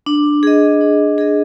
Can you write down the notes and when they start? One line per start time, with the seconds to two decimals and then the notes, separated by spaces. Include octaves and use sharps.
0.06 D4
0.43 G#4 D#5
0.81 D4
1.18 G#4 D#5